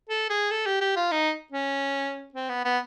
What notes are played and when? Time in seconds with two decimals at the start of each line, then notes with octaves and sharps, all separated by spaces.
0.09 A4
0.30 G#4
0.51 A4
0.66 G4
0.81 G4
0.96 F4
1.12 D#4
1.52 C#4
2.34 C4
2.49 B3
2.65 B3